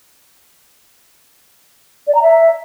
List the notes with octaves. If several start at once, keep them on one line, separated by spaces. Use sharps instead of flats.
D5
A#5
E5